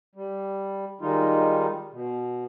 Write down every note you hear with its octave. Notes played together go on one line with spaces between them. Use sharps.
G3
D#3 G3 G#3 D#4 F4
B2